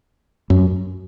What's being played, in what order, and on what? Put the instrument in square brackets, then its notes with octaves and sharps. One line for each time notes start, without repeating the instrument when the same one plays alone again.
[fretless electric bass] F#2